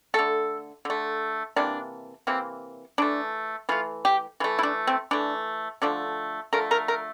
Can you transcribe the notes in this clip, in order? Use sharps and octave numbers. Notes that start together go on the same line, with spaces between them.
D3 A3 A4
D3 A3
C3 E3 A#3 D4
C3 E3 A#3 C4
E3 A3 D4
E3 A3 F4
G4
E3 A3 F4
E4
D4
C4
E3 A3 D4
D3 F3 A3 D4
D3 F3 A3 A#4
A#4
A#4